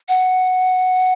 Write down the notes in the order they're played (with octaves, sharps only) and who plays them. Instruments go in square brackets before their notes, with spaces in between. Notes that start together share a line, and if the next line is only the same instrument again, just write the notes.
[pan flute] F#5